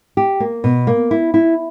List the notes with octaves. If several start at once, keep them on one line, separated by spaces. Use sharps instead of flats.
G4
A#3
B2
A#3
E4
E4